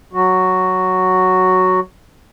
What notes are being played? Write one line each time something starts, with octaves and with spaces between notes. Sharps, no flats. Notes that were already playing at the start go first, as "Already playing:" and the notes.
F#3 F#4